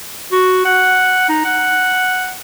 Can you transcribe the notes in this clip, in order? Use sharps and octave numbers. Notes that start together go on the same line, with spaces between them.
F#4
F#5
D#4
F#5